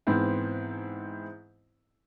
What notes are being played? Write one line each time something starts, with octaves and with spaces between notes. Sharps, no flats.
G#2 E3 B3 C4 E4